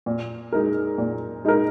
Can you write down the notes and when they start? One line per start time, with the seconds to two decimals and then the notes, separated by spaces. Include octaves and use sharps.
0.06 A#2
0.52 G#3 D#4 A#4
0.98 A#2
1.45 G#3 D#4 A#4